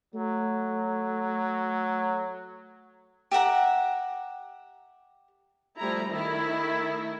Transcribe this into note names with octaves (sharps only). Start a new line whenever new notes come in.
F#3 A3
G4 E5 F#5 A#5
F3 G3 A3 E4 A#5
D#3 A3 E4